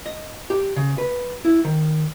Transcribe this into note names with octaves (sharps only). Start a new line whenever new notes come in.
D#5
G4
C#3
B4
E4
D#3